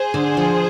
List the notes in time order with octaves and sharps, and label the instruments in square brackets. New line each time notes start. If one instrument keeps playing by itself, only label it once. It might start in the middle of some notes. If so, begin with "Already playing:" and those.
Already playing: [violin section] G#4 C5
[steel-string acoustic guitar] D3
F3